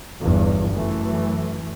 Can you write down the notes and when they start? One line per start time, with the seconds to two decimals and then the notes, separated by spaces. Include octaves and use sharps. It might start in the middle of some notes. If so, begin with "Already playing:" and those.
0.23 G1 E2 G2
0.75 F#2 E3 A3